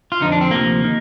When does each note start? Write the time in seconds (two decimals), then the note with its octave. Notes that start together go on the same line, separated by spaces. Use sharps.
0.12 F4
0.20 F2 D3 F3 D#4
0.32 D4
0.41 C4
0.51 D2 C3 F3 A#3
0.84 D#3